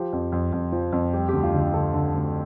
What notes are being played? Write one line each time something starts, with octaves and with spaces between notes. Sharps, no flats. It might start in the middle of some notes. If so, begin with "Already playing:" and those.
Already playing: F3 G4
F2
F2
F2
F3
F2
G3 G4
D2 G4
F4
D3 G4
D3 A4
D3
D2